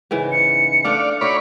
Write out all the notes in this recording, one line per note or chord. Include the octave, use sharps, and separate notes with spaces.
G#2 C#3 E3
C#7
A3 D4 D5 F5 F#5
D#4 E4 F#4 C#5 D5 B5